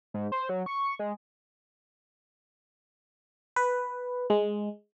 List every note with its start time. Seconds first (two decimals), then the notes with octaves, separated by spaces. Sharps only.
0.14 G#2
0.32 C5
0.49 F#3
0.66 C#6
0.99 G#3
3.56 B4
4.30 G#3